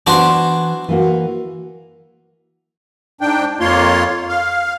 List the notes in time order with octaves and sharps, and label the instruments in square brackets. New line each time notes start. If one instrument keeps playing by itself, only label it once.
[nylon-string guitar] E3 B3 [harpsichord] D4 F#4 C5
[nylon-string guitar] E3 A#3 F#4
[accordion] G#2 D4 G5
F2 A#3 F4 C#5 C6
F5